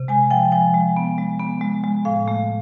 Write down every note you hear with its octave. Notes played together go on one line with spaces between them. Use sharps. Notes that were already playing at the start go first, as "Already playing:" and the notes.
Already playing: C3
G#3 G#5
F3 G5
F3 G#5
G#3
B3
G#3
B3
G#3
G#3
A2 F5
A3